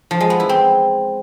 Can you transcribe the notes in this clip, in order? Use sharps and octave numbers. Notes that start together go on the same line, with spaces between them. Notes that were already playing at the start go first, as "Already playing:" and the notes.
F3
G#3
B3
E4
C4